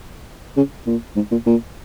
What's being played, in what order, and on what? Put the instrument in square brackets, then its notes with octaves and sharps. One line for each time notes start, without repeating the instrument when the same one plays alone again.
[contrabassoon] C#3
A#2
G#2
A#2
A#2